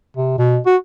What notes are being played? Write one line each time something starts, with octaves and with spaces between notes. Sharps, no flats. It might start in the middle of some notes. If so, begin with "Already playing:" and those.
C3
B2
F#4